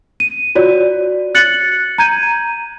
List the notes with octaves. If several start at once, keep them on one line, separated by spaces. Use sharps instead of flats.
D#7
F4 F#4 C#5 D5
F#6 A6 C#7 F#7
A#5 G6 G#6 D#7